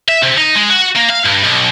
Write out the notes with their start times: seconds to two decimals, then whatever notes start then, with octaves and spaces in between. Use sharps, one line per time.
0.08 E5
0.22 C3
0.37 D#4
0.55 G#3
0.70 F#4
0.96 A#3
1.10 F5
1.26 G2
1.44 B1